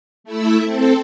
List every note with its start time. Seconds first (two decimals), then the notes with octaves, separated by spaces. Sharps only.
0.24 A3 E4 E5
0.64 C4 A4